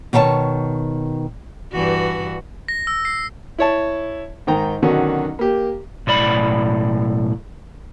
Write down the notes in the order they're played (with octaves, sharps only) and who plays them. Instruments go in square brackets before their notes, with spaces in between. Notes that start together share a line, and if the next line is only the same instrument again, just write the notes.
[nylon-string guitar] B2 D#3 C#5 G5 A5
[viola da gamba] G2 E3 F#4
[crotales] A#6
E6
C7
[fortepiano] E4 C#5 A5
G#2 D#3 G5 A#5
B2 D3 D#3 F#3 C#4 F#4
A#3 G4
[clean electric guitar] B1 A2 D5 B5